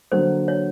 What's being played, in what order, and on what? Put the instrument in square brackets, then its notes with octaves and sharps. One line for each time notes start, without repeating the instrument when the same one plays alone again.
[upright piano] D3 F#3 A#3 [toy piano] C5
[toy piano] C#5